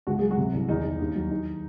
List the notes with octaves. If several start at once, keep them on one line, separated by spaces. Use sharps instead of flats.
C#2 F#4
F#3 G#4
F#3 F#4
C3
C2
E2 D#3 D#4
D#3
D#2
F#3
D#3